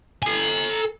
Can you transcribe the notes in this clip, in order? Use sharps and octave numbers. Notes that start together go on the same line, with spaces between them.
A4 G#5